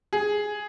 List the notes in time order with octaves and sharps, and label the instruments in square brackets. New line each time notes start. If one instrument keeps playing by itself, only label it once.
[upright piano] G#4